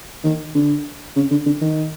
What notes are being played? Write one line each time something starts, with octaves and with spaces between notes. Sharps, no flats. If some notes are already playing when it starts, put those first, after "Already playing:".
D#3
D3
C#3
D3
D3
D#3